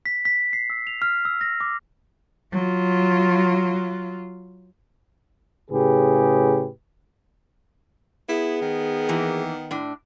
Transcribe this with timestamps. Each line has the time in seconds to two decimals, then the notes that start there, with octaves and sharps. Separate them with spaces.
0.06 B6
0.25 B6
0.53 C7
0.70 E6
0.87 F7
1.02 F6
1.25 E6
1.41 A#6
1.61 D6
2.52 F#3 F4
5.71 A2 C#3 G4 G#4 B4
8.29 B3 E4 G#4
8.62 D#3
9.09 E3 A#3
9.71 A2 D4